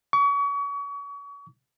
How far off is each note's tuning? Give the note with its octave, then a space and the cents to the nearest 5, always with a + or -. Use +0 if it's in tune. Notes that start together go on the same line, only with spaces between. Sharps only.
C#6 +35